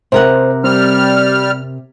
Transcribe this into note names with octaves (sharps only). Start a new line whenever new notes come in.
C3 A#4 C5 F#5
G3 C4 F6